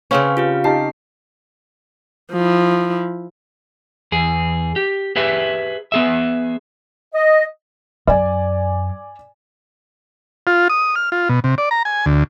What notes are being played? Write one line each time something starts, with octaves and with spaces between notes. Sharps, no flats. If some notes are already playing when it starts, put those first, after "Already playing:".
C#3 C4 C#4 B4 F5
F4 G4 F5
D#4 G4 A5 C7
F3 E4
E2 G#4
G4
G4 G#4 B4 E5
B3 G#4 E5
D#5
F#2 D5 G#5
F4
D#6
F6
F4
B2
C3
D5
A#5
G#5
D2